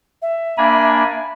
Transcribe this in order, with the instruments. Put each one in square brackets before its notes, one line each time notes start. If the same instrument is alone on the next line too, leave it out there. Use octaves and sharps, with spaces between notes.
[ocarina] E5
[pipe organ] A#3 D4 G#5 [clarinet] B5